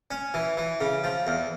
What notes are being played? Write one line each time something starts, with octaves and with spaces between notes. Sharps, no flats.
C#4
E3
E3
C#3
F3
E2